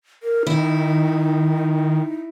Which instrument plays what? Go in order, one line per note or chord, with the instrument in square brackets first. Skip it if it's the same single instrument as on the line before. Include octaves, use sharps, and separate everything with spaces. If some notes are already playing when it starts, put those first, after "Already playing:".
[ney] A#4
[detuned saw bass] D#3 [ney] D#4 [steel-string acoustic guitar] E4